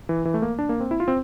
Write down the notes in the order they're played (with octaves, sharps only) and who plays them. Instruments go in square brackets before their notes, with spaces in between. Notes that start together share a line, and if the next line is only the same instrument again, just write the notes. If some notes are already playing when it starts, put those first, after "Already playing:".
[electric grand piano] E3
E3
A3
A#3
D4
A#3
C4
E4
F4
C4